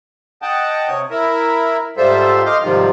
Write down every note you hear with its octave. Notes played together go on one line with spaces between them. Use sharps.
D#5 F#5 G5 A5
C3 C#5 D#6
E4 A#4 E5
G#2 G3 F4 A4 C5 E5
D#5 F5 C6 D6 F6 G6
G#2 C3 D#3 F3 G3 F4